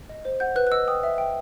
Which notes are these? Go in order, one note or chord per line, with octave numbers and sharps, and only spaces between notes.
D#5
C5
F#5 G6
B4 F#6
F#6
D#5 E6
G5 D#6
E5
G5